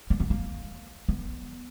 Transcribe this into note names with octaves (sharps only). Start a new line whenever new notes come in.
A#3
B3
A#3
B3